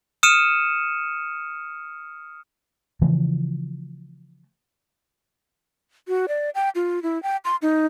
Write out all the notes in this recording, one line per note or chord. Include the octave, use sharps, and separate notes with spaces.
D#6 F6 C#7 D#7 E7
C#3 E3 F3 A3
F#4
D5
G5
F4
E4
G5
C6
D#4